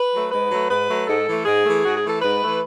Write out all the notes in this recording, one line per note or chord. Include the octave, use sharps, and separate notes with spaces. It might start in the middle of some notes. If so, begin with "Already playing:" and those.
Already playing: B4
F#3 A3
G#2 B4
F#3 A3
G#2 B4
F#3 A3
G#2 A4
E3 A3
G#2 G#4
E3 A3
G#2 F#4
G#4
E3 A3
A4
G#2 B4
E3 A3